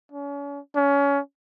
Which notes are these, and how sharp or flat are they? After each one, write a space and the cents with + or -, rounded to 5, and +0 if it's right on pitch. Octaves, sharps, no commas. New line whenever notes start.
C#4 +40
C#4 +25